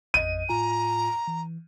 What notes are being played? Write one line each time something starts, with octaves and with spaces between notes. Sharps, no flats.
A1 F2 D#5 D#7
A2 F4 G#5 A#5
E3